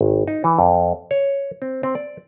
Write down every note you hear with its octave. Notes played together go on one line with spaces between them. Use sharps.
G#1
D#4
E3
F2
C#5
C4
C4
D5